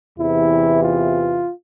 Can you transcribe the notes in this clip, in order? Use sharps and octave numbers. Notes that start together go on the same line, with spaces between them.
E2 C3 E3 E4
F4